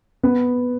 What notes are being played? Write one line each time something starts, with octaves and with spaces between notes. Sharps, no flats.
B3 B4